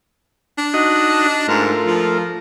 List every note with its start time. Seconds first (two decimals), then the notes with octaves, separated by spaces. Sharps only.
0.58 D4
0.74 D#4 F#4 D#5
1.48 G#2 A3 F4 A#4
1.87 F3